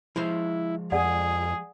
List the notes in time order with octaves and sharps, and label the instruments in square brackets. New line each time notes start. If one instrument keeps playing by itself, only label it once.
[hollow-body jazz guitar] F3 G#3 C5 [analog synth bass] E4
[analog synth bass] F2 [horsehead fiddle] G#4 [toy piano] D5 F#5